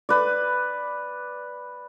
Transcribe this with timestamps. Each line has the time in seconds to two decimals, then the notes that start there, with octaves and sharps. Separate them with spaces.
0.09 B4 D5